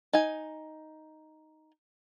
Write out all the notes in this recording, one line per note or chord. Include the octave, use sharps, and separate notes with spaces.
D#4 G#5